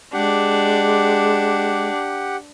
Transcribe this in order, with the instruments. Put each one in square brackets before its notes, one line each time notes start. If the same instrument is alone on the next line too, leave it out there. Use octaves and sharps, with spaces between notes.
[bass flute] G#3 [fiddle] D4 [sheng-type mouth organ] G4 F#5